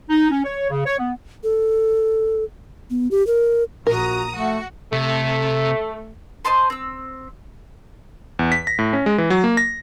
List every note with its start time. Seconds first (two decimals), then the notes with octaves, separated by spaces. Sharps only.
0.10 D#4
0.30 C#4
0.44 C#5
0.70 C#3
0.85 C#5
0.98 B3
1.44 A4
2.90 B3
3.11 G4
3.27 A#4
3.87 A#1 F#4 A#4 A#5 D#6
4.36 A3 F#4
4.92 C3 A3
6.45 C5 D#5 A5 C6
6.70 C4 E6
8.39 E2
8.52 B6
8.67 A#6
8.79 A2
8.93 C#4
9.06 G#3
9.18 E3
9.30 F#3
9.44 A#3
9.57 A#6